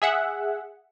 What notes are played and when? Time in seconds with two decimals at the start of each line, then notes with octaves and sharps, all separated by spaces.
0.02 G#4 E5 F#5